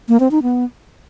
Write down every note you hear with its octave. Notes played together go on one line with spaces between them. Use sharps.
A#3
C4
D#4
B3